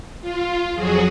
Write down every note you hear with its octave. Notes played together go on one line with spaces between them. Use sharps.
F4
F2 F#3 F#4 G#4